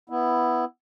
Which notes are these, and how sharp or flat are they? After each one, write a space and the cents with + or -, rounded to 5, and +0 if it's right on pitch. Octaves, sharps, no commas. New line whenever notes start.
B3 +0 E4 +0